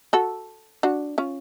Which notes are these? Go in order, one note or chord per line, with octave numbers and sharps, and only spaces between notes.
F#4 A4
D4 F#4
C#4 F4